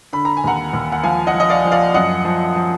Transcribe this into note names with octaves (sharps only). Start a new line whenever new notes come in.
D3 B5
A#5
G#5
D#2 F#5 A#5
D#2
F#5
F3 F5 G#5
D#5 F#5
F3
D#5
D5 F5
F3
D5 F5
F#2 D#5 F#5
F3
F3